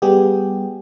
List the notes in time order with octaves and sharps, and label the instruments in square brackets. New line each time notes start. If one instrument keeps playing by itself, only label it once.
[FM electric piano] G3 B3 G4 G#4